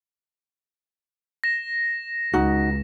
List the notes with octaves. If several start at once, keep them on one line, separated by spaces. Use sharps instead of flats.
A#6 E7
C#2 D#4 F#4